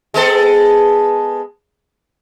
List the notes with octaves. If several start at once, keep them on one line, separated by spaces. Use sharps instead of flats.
G#3 B3 A4